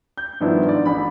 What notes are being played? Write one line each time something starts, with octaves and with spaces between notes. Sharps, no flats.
G6
G2 D#3 F3 B3 D4 E4
G#2 D5
A1 D4 B5